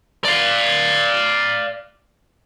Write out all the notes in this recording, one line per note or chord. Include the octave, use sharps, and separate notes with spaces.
D5 F5